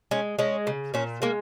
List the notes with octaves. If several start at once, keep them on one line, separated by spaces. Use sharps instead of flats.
G#3 C#4
G#3 C#4
C#3
A#2 C#4
G#3 A#3